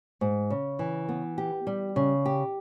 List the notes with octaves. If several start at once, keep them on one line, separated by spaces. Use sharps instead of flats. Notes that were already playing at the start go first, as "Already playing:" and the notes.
G#2
C#3
E3
B3
G4
G3
C#3
G4